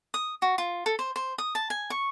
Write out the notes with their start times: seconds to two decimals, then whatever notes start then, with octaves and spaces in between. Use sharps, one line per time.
0.14 D#6
0.42 F#4
0.58 F4
0.86 A4
0.99 C5
1.16 C5
1.38 D#6
1.55 A5
1.70 G#5
1.90 C#6